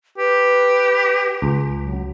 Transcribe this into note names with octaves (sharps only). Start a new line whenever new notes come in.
G4 B4
C#2
F#3